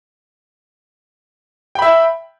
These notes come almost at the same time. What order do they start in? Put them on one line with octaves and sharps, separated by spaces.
G5 B5 E5